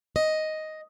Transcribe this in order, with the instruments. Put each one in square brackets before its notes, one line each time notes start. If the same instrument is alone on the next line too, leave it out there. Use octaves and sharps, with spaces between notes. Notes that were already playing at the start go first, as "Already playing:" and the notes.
[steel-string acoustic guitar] D#5